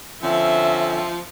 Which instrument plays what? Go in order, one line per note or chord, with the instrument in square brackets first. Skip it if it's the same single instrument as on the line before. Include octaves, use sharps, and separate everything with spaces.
[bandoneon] D3 C4 C#4 [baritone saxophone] F3 [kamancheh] E5